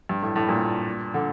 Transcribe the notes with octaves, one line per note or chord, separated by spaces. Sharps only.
G2
A2
A2
G2 A#2
D3